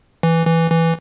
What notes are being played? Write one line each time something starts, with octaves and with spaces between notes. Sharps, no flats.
E3
E3
E3